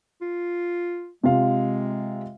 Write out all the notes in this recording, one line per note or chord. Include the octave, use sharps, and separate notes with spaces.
F4
C3 G#3 F4 F5